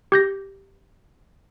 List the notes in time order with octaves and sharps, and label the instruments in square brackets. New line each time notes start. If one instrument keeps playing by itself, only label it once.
[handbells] G4 G6 A#6